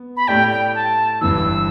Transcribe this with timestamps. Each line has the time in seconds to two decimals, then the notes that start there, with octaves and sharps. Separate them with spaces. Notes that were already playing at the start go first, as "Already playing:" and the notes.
Already playing: B3
0.17 B5
0.28 A2 A3 G4 D5 G5
0.51 G5
0.75 A5
1.21 G1 G2 E3 E6